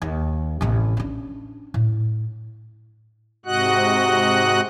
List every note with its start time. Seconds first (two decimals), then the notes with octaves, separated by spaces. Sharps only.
0.02 D#2
0.61 A1 C3
0.97 C#4 D4
1.74 A2
3.46 G#2 C3 F#4 D#5 F#5 F#6